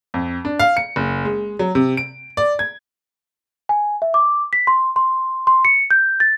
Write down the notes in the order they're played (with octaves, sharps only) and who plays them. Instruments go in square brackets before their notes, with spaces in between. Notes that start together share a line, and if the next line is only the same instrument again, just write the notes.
[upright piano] F2
D4
F5
C#7
F#1
G#3
F#3
C3
D7
D5
G#6
[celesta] G#5
E5
D6
B6
C6
C6
C6
C#7
G6
A6